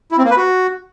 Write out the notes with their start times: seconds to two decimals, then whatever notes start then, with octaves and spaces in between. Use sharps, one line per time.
0.11 E4
0.18 C4
0.24 A#3
0.30 B4
0.37 F#4